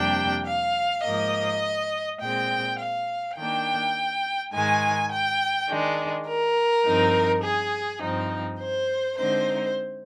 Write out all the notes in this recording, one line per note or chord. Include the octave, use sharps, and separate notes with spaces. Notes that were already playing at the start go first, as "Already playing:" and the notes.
Already playing: F2 C3 G3 A#3 D4 G5
F5
G#2 F3 A#3 D#5
A#2 G#3 C4 G5
F5
D#3 A#3 D4 G5
G#2 D#3 G#3 G#5
G5
D#3 G#3 D4
A#4
G2 F3 C4 D#4
G#4
G2 F3 C4 D#4
C5
D3 G#3 C4 D#4 C5